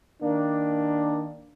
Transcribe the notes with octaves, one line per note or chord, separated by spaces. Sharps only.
D#3 A#3 D4